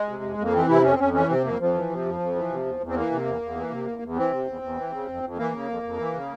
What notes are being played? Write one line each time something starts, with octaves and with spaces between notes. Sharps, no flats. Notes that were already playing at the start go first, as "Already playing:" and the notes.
Already playing: G#3
C3
F2
F2 A#3
E3 C4
C3 E4
F2 C#4
C4
F2 C#4
E3 C#4
C3 C4
F2 A#3
F2 F3
E3
C3
F2
F2
E3
C3
E2
E2
C4
E3 A#3
C3
E2
E2
E3
C3
E2
E2
E3 C4
C3
E2
E2
E3
C#3
F2
F2
E3 A#3
C#3
F2
F2
E3
C#3